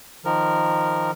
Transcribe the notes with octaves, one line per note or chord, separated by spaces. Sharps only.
D#3 F3 A#4